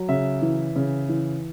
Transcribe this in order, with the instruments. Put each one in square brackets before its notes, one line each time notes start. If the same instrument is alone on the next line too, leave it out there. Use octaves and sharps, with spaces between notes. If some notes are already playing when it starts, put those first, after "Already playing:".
Already playing: [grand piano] F#3
C#3 E5
E3
C#3
E3